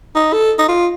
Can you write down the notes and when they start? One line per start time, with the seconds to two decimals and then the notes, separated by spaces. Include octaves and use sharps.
0.15 D#4
0.33 A4
0.58 D#4
0.68 F4